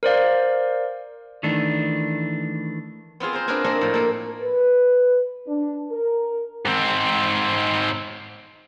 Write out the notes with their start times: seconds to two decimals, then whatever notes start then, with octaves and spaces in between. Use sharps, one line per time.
0.03 A#4 C5 D5 F5
1.43 D#3 E3 A3 D4
3.20 B3 C4 F4 G#4
3.33 C5 G#5 A#5
3.48 C4 D4 G#4 A#4 B4 G#5
3.64 A#3 C4 D4 A4 D#5
3.81 A2 F3
3.94 A#3 A4
4.41 B4
5.47 D4
5.90 A#4
6.66 G#2 C4